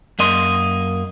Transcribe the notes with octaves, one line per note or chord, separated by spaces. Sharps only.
F#2 A#3 D#5 C6